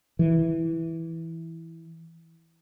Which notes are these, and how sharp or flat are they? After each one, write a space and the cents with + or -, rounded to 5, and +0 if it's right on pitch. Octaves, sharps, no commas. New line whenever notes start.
E3 -5